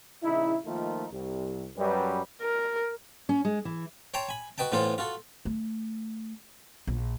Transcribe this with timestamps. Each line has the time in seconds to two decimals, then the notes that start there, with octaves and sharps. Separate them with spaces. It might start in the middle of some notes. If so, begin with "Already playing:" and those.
0.24 A#1 C#3 D#4 E4
0.66 D#3 F3 A3 A#3 D#4 F4
1.12 C2
1.77 F#2 G3 B4
2.41 A#4
3.29 C#4
3.45 G#3
3.65 E3
4.14 C#5 G5 A5 A#5 C6
4.29 G#5 B5
4.58 F#4 B4 D#5 G5 A5
4.72 A2 E3 B3 F4 A4 C5
4.98 F4 F#4 A4
5.45 A3
6.87 A#1